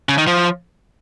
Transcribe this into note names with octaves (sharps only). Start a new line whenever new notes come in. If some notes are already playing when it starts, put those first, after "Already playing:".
C#3
D#3
F3